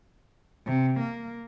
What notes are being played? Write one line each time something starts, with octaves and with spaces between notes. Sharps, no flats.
C3
A#3